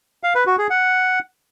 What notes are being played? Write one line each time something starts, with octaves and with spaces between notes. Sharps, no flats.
F5
B4
F#4
G#4
F#5